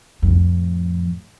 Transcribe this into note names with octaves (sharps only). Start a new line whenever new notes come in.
F2 A2